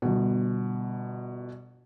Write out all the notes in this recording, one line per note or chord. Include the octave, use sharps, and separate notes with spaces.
G1 B2